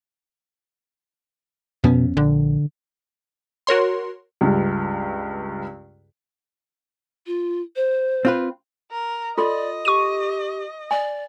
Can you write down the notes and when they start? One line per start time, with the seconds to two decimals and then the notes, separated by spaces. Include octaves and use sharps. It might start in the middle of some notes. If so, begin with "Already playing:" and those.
1.84 F2 B2 B3 C#4
2.17 A#1 D3
3.67 F#4 A#4 C#5 C6
4.41 C#2 G2
7.27 F4
7.76 C5
8.25 C4 F4 B4
8.91 A#4
9.38 F4 A4 D5 D#5 C6
9.85 G4 C#6 D#7
10.91 D5 G#5